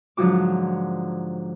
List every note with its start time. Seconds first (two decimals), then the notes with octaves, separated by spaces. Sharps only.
0.17 G#2 D3 F3 F#3 F#4 D6